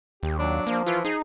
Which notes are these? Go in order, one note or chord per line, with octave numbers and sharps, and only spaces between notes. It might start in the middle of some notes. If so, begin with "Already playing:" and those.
D#2 G4
F#3 D4
F3 A#3
E3 F4
D#4 G#4